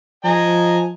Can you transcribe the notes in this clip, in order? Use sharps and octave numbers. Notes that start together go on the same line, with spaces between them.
F3 D#5 G#5 A#5